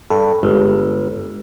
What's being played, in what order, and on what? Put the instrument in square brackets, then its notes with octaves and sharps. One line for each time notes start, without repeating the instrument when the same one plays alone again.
[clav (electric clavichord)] G2 [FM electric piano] A4
[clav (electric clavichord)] G1 [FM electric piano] G#3